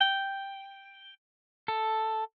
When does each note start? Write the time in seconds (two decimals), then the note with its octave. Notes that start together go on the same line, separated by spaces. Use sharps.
0.01 G5
1.68 A4